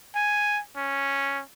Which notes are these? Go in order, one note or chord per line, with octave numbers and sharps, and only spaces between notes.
G#5
C#4